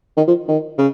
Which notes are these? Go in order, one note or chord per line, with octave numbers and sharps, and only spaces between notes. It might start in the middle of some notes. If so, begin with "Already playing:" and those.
D#3
F3
D#3
C#3